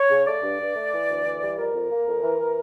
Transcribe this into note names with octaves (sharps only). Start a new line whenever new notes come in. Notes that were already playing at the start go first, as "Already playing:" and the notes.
Already playing: C#5
C#3
A3 D5
G2
G2
A3
E3
D2
E3
G3
F2 A#4
F2
A#3
F2
E3
E3